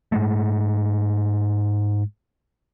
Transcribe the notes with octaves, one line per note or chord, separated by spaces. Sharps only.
G#2 G#3 A3